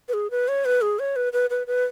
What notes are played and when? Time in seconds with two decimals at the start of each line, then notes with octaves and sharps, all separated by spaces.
0.08 B4
0.13 G#4
0.31 B4
0.48 C#5
0.65 B4
0.82 G#4
0.99 C#5
1.16 B4
1.33 B4
1.50 B4
1.67 B4